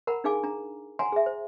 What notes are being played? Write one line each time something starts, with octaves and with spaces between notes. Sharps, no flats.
A#4 F#5 A#5 B5
D4 D#4 G#4 F5 G#5 D6
D4 A#5
F#5 G#5 A#5 C6
G#4 E5
C5